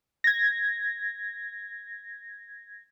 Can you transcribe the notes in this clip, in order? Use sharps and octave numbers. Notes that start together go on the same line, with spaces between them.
G#6 A#6